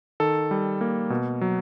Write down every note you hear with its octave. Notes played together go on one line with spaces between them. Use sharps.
D#3 A4
G3
A#3
B2
F#3